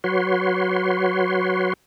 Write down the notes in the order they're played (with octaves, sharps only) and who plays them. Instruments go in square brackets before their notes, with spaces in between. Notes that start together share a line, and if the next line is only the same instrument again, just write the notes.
[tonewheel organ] F#3 F#4 B4 C#5 C6